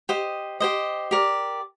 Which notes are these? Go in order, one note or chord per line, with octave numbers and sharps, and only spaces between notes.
G4 C5 D#5
G4 C5 D#5
G4 A#4 D5